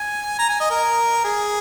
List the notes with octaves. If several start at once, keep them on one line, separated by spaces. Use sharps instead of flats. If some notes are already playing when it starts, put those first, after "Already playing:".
Already playing: G#5
A#5
G#5
D#5
A#4
G#4